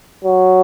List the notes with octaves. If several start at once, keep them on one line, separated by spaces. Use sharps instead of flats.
F#3